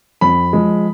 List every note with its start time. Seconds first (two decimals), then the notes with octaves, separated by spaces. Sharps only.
0.21 F2 B5
0.53 F3 G#3